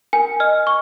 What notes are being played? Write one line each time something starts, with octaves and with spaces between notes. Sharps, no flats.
A#4 G#5
D#5 F6
C#6